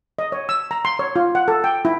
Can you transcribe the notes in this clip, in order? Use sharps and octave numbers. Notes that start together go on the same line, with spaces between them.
D#5
C#5
E6
A#5
C6
C#5
F4
F#5
A4
G5
E4